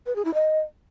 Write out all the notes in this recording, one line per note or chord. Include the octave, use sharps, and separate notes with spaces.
B4
G#4
E4
D#5